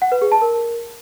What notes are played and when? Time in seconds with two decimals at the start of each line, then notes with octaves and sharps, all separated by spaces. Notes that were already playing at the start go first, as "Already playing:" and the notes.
0.02 F#5
0.12 B4
0.22 G#4
0.32 A5
0.42 A#4